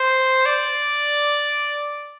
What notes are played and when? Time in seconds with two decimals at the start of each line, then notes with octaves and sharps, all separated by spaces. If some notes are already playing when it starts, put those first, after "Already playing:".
Already playing: C5
0.46 D5